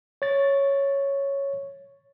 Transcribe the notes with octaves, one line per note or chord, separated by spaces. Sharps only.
C#5 A6